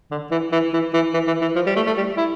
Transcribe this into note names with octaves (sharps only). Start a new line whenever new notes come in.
D3
E3
E3
E3
E3
E3
E3
E3
F3
G3
A3
A3
G3
E4